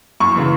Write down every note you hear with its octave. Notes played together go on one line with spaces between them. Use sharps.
F#2 C#6
C#3 E3